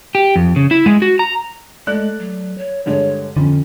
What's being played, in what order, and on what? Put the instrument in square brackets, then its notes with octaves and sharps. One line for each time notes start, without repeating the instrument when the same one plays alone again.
[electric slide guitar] G4
F2
C#3
E4
G#3
F#4
A#5
[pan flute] G#3 [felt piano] A3 D5 F#6
[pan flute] F#3
C#5
[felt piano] G2 D3 G#3 [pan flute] C#5
[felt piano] F2 [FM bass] D3 [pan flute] C#4